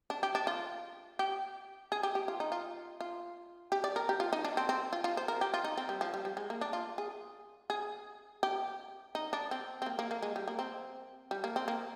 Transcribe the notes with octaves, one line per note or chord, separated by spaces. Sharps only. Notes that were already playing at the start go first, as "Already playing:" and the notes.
D4
G4
D4
F4
G4
G#4
G4
G4
F4
D#4
F4
F4
G4
D5
A#4
G4
F4
D#4
D4
C4
C4
F4
F4
C5
A#4
G4
F4
D#4
C4
G3
F3
G3
G3
G#3
A#3
D4
F4
G#4
G#4
G4
D#4
D4
C4
C4
A#3
A#3
A#3
G#3
G3
A#3
C4
G3
A#3
C4
A#3